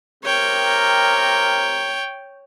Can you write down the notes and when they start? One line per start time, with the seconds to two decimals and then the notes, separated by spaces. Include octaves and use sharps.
0.24 C3 A#4 C#5 G5